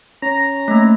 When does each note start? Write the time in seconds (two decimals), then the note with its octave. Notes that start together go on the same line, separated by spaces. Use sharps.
0.22 C#4 A#5
0.68 A3 A#3